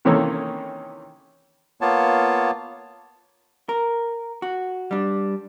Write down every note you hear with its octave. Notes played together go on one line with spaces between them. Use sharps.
C3 D#3 E3 A#3 C#4 A4
A#3 B3 F4 C#5 A5
A#4
F#4
G3 D4